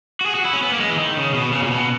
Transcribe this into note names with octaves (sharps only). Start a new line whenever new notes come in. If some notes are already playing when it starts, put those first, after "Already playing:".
F#4
G#4
F#4
E4
C#4
B3
A#3
G#3
E3
D#3
C#3
B2
C#3
A#2
B2